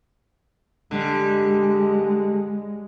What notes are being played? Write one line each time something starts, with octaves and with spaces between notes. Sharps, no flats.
D3 G3 G#3